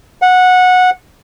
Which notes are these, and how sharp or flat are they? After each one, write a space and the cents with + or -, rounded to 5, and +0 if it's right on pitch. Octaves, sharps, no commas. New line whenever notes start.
F#5 -15